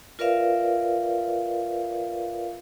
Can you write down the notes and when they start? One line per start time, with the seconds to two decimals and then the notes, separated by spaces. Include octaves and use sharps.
0.19 F4 A#4 B4 D5 E5 F5